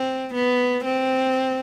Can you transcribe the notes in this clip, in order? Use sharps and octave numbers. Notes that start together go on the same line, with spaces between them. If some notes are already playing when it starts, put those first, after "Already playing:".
Already playing: C4
B3
C4